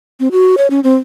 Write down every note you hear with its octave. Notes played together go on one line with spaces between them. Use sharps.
C4
F#4
C#5
C#4
C4